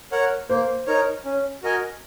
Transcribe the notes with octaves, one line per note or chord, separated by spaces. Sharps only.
A#4 C#5 F#5
A#3 C5
D#4 A#4 C#5
C#4
F#4 A#4 D#5 G#5